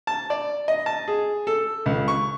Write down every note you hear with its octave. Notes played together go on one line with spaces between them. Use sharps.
A5
D5
D#5
A5
G#4
A4
C#2
C#6